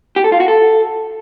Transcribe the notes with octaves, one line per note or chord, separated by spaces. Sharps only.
G4
A4
F4
F#4
A4